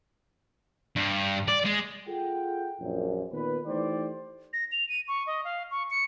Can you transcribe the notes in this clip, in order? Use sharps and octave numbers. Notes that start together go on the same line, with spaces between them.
G2
D5
G#3
F4 G#4 A4 F#5 G5
A#1 F#2
A#2 D#3 B3 B4
E3 A3 D#4 G4 C5 D5
A#6
F7
D#7
C#6
D#5
F5
C#6
C#7